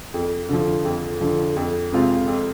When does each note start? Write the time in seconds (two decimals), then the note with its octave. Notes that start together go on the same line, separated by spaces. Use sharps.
0.14 F2
0.49 D3 F3
0.85 F2
1.21 D3 F3
1.56 F2
1.92 C3 G#3 C4 F4
2.27 F2